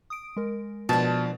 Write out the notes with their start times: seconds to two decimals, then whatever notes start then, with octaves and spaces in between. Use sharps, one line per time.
0.10 D#6 D7
0.36 G#3 A#4
0.89 B2 F3 D4 A5